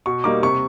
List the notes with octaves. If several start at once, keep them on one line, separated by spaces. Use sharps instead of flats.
B2 C#6
G3 A#3 D#4 D6
C3 C#6